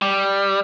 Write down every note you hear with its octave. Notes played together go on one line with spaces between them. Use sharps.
G3